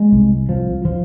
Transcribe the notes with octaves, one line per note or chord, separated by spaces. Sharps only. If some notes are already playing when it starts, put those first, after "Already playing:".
Already playing: G#3
C2
F3
F3